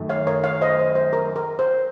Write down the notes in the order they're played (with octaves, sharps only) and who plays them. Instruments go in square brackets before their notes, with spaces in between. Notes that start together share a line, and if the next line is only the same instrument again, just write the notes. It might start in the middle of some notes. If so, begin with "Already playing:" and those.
Already playing: [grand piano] F#2 D#3 A3
[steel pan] C#5 F5
A#4 C#5
C#5 F5
C5 D#5
C5
C5
A#4
A#4
C5